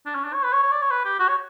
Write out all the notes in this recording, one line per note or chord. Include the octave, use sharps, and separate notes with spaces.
D4
C#4
D4
C#5
B4
C#5
C#5
D5
C#5
B4
G4
F#4
C#5